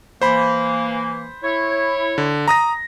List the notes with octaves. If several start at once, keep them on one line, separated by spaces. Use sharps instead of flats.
E3 A#3 C5 B5
E4 C#5
D3
A#5 D#6 A#6